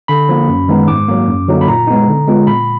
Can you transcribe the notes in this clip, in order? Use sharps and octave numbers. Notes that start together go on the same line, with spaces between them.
D3 B5
F3 A#3
F#2
D#3 G#3 B3 D#4
G#2 D6
F#3 A#3
F#2
D3 F#3 A#3 D#4
B5
A#2 A#5
G#3 B3 D#4
D3
G#3 B3 F4
A#2 B5